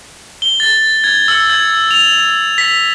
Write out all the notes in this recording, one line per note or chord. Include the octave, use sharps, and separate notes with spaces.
G7
A6
G#6
E6
G#6
F7
B6